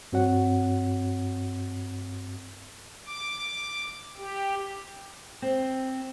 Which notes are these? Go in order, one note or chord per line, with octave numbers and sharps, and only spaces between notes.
G2 C4 F#4 C#5 F#5
D6
G4
C4